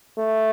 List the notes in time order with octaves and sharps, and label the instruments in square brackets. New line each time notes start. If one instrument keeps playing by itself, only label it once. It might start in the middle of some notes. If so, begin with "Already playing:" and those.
[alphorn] A3